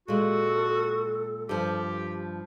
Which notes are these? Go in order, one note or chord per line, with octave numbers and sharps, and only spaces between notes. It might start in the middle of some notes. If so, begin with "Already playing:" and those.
A#2 G#3 F#4 A4
G2 F3 G4